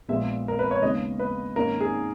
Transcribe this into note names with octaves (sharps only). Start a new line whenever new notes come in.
A#1 A#2 G#3 B3 E5
A#4
B4
C#5
D#2 C#3 G#3 B3 D#5
B4
G#2 D#3 A#3 C#4 A#4
G#4